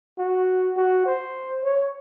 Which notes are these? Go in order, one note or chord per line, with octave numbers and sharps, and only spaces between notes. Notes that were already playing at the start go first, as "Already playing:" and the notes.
F#4
F#4
C5
C#5